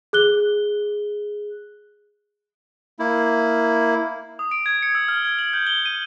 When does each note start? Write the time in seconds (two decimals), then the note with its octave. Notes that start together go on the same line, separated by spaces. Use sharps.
0.13 G#4 F#6 G7
2.99 A#3 E4
4.39 D#6
4.51 D7
4.66 G#6
4.82 C#7
4.95 E6
5.08 F6
5.25 G#6
5.39 F#7
5.53 G6
5.67 G7
5.86 D#7